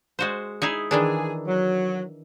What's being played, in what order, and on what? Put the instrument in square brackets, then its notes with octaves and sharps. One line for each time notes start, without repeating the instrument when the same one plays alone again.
[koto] G#3 F#4 C5
D#4 E4 G#4
[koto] D#3 E3 D4 [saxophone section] G#4
[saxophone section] F#3